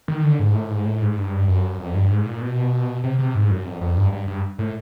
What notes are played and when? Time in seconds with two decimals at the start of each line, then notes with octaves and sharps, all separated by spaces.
0.08 D#3
0.24 D3
0.39 G#2
0.55 A2
0.71 G#2
0.86 A2
1.01 G#2
1.17 G2
1.48 F#2
1.79 F2
1.95 G2
2.11 G#2
2.26 A#2
2.42 B2
3.04 C3
3.19 C3
3.35 G#2
3.50 F#2
3.65 F2
3.81 F2
3.97 G2
4.12 G2
4.27 G2
4.59 A2